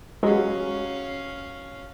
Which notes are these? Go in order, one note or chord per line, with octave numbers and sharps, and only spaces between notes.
F#3 G#3 C#4 F#4 F5